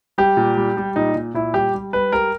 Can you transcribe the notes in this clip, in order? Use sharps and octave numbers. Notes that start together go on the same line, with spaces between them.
G3 G4
A#2
G3
G3
A#2 D#4
A#2
A#2 E4
G3 G4
G3
G3 B4
G3 A#4